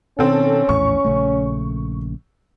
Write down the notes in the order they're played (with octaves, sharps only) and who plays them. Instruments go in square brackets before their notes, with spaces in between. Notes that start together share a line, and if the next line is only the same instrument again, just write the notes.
[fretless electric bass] B2 D3 D#3 [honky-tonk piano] C4 A4 [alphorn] C#4
[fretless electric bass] A#1 E2 A2 [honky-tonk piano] C#6
[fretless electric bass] A#1 C#3 A3